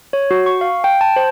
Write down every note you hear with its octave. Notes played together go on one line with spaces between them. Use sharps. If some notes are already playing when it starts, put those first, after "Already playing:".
C#5
F#4
C#6
F5
G5
A5
C5